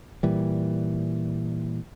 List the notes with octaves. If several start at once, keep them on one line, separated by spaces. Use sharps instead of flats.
A#2 E3 G3